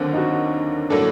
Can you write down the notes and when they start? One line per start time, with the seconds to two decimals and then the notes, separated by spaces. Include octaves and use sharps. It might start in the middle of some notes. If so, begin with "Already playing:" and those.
Already playing: D#2 D3 F#3 A#3 C4 D4
0.13 D#4
0.17 F#4
0.90 A2 F#3 A#3 D4 A4